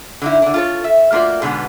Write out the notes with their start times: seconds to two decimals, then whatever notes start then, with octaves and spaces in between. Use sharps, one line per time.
0.22 D3 D#4 E4
0.42 D3 D4
0.54 F4 A4 C#5
0.84 E5
1.12 A3 A#3 F4 F#4 D5
1.42 G#2 B2 D3 G#3 B3